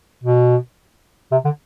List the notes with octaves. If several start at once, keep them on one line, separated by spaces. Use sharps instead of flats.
B2
C3
D3